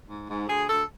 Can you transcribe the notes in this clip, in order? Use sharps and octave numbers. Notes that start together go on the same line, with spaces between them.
G#2
G#2
D2 G#4
D2 A4